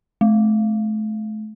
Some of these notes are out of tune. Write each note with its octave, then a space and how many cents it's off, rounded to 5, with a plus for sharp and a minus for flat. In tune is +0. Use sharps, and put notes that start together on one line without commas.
A3 -35